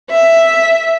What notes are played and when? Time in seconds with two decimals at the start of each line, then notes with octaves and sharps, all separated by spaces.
0.10 E5